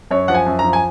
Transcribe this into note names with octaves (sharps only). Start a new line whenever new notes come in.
F#2 C#5
F3 F#5
G#5
F#2
F3 A#5
G#5